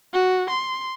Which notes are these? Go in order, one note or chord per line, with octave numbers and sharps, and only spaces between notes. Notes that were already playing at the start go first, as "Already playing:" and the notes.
F#4
C6